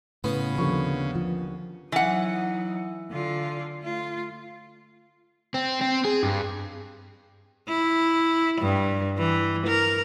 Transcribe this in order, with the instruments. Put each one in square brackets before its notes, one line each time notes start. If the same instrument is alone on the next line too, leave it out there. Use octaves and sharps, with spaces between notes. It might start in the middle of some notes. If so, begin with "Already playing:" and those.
[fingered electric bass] A2 [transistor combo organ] C#3 [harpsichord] B3 [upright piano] F#5
[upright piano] D#2 D3 C#6 [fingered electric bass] F3
[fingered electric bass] F3
[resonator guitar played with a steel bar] E3 F#5 [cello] F#3 D#4
[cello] D3 F4
A3 F4
[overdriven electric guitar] C4
C4
G#4
G2
[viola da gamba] E4
G2
E3
A#4